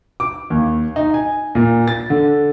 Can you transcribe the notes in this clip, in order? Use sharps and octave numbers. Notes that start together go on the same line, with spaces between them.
D6
D#2
D#4
G#5
A#2
A6
D3